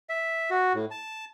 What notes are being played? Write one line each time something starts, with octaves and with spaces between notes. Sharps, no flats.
E5
F#4
A2
A5